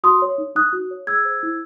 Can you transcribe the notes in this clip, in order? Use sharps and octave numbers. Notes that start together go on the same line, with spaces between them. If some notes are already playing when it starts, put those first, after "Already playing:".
F#4 C6 D#6
C#5
D#4
D#4 D#6 F#6
F#4
C#5
G#4 E6 G#6
C5
E4